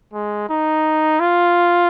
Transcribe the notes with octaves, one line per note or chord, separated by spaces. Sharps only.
G#3
D#4
F4